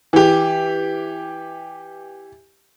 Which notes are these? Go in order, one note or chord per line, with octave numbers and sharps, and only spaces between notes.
E3 G4